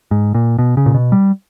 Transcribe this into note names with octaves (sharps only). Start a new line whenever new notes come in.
G#2
A#2
B2
C#3
A#2
B2
G3